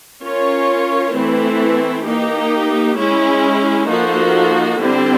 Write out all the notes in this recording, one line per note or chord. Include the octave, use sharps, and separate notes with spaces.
C#4 F4 A#4 C#5
E3 A3 C4 E4
A#3 D#4 G4
G#3 C#4 E4
F3 A#3 D#4 F#4 A4
D3 G3 C4 E4